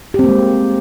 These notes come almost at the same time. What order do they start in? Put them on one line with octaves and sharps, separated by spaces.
G4 C4 A#3 G#3